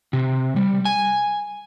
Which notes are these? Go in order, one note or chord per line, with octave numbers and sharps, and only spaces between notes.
C3
G3
G#5